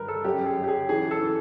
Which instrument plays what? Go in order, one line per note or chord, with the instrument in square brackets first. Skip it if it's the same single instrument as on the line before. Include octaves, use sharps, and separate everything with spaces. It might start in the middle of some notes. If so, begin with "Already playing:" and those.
Already playing: [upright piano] G2 D#3 A#4 B4
A4
F#2 G4
G#4
F#3
G4
G#4
E3 G#4
A4
E3